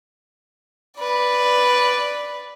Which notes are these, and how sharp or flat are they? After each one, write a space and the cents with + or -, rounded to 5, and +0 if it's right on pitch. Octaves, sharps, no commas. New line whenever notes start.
B4 +0 D5 +0